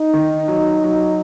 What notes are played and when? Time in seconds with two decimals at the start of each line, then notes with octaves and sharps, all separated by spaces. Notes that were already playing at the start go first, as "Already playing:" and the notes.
Already playing: D#4
0.13 D#3
0.48 F#3
0.84 F#3